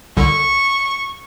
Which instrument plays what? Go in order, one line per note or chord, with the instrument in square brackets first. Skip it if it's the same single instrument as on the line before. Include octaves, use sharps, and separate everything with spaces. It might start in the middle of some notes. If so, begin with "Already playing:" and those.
[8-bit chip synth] C2 D3 [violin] C#6